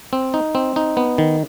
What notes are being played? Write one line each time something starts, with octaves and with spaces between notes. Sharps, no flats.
C4
D#4
C4
D#4
B3
D#3